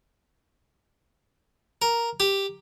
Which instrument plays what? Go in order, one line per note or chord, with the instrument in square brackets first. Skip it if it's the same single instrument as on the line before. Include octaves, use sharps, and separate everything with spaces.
[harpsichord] A#4
G4